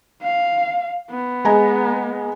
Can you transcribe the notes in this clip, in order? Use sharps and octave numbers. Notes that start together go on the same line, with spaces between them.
F5
B3
G#3 G#5 A#5